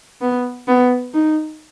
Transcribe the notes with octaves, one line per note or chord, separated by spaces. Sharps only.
B3
B3
D#4